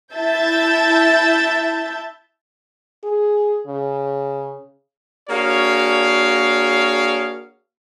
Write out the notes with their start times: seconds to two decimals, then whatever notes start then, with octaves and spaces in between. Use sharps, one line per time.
0.15 E4 E5 A5 G6 A6
3.04 G#4
3.67 C#3
5.29 A#3 D4 F#4 G#4 C#5 F5